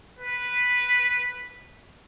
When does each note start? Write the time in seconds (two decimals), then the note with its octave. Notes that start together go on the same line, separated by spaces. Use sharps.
0.19 B4